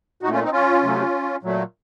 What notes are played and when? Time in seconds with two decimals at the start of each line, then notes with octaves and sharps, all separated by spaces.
0.23 A#2 D#4 F#4
0.27 A3
0.32 C#4 F4
0.43 C4 D#4
0.52 C#4 F4
0.83 C3 F#3 A3
1.43 A#2 F#3 A3